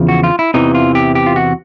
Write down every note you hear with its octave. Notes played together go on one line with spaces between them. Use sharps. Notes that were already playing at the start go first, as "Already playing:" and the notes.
Already playing: E2 C#3 F3
F#4
F4
E4
E2 C3 E3 D#4
F4
G4
G4
F4
F#4